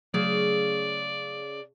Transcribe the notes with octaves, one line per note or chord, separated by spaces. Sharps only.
C#3 F#3 A3 D5